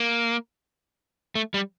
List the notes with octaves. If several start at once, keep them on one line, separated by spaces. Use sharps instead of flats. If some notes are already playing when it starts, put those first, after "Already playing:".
Already playing: A#3
A3
G3